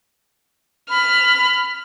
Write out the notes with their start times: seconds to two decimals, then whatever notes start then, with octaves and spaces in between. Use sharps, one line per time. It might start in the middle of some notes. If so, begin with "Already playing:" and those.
0.90 B5 F6